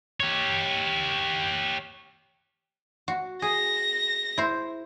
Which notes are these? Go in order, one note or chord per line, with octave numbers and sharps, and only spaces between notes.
G4 C#5
F#4
G#4 A#6
E4 C5